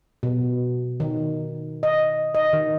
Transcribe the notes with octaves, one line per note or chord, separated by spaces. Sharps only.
B2
D#3
D#5
D#5
D#3